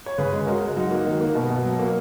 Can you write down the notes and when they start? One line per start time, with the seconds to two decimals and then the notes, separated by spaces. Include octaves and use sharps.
0.06 C#5
0.18 C#3 G#4 B4
0.33 G#3
0.47 G#3 F#4 A#4
0.62 G#3
0.76 F#3 D#4 F#4
0.91 A#3
1.07 D#3
1.21 A#3
1.35 B2
1.50 B2
1.65 F#3
1.79 A#3